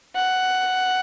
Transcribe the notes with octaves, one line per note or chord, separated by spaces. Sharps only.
F#5